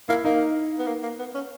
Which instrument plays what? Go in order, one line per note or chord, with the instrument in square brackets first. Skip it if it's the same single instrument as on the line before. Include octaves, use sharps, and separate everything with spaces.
[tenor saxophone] A#3 [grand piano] E4
[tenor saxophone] A#3 [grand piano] D#4
[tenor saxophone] B3
A#3
A#3
B3
C#4